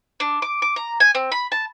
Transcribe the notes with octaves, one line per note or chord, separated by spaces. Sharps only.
D4
D6
D6
A#5
G#5
C4
B5
A5